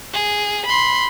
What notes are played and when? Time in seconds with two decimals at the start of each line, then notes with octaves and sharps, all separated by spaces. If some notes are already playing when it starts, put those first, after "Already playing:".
0.14 G#4
0.65 B5 C6